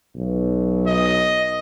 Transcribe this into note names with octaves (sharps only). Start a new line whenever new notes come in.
B1
D#5